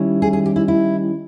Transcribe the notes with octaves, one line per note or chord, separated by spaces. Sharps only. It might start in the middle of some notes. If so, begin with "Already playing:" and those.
Already playing: D#3 G3 C#4 E4
G#4
G#4
G4
E4
E4